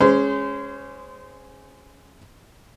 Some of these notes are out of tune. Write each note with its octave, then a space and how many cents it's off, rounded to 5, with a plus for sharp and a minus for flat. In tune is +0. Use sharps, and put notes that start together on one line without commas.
G#3 +0 C#4 +0 C5 -30